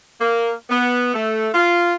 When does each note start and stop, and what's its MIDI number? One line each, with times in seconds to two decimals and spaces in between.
0.21 0.51 58
0.70 1.12 59
1.14 1.49 57
1.54 1.94 65